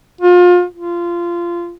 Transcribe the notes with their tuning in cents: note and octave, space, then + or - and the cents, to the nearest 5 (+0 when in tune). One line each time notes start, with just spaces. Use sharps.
F4 +30
F4 -20